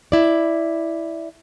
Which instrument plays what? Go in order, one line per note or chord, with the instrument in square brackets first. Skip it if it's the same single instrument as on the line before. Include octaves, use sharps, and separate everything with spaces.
[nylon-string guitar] E4 D5